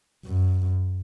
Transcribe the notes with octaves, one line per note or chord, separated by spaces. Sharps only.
F#2